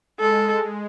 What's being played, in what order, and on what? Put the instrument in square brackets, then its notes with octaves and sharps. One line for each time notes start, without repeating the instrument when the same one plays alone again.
[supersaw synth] G#3 [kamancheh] A4